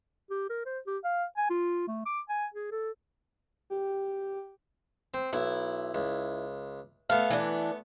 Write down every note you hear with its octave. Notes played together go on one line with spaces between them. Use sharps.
G4
A#4
C5
G4
F5
G#5
F4
A3
D6
G#5
G#4
A4
G4
C4
B1 E4
C#2
A3 B3 F5
E3 D4